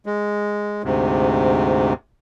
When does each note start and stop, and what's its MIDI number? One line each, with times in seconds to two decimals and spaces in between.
0.06 0.82 56
0.84 1.93 38
0.84 1.93 44
0.84 1.93 48